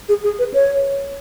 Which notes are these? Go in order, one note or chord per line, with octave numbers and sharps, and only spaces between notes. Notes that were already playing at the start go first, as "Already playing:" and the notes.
G#4
G#4
B4
C#5